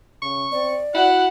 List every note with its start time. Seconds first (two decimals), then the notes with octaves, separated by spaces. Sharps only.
0.22 C#3 C#6
0.52 C4 D5
0.95 E4 F#4 F#5